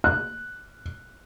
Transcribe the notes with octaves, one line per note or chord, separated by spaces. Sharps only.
F#6